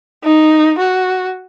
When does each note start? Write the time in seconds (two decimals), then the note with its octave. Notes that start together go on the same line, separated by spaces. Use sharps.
0.24 D#4
0.78 F#4